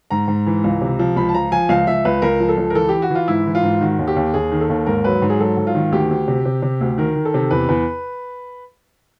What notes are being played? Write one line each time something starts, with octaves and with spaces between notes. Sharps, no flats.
G#2 A#5
G#2
E3
C#2
C3
F3
C#2 B5
A5
F3 A#5
F3 G#5
C#2 F5
C#2 E5
C#2 B4
C#2 A#4
F3
A4
C#2
A#4
E3 A4
E3 G4
F#4
E3 F4
G#2 E4
E3
F4
G#2
D#3 F#4
D#2
G4
D#2
D#2 G#4
D#3
A4
D#2
G#2 A#4
F#3 B4
G#2
G#4
F#3 A4
G#2
F4
D#3
D2 G4
D2
C3
C3
C3
D2
D#3 A#4
D#3
A4
C3
E2 B4
E2